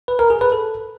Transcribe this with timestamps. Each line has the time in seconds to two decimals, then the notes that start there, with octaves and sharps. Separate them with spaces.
0.08 B4
0.19 A#4
0.30 G#4
0.41 B4
0.52 A4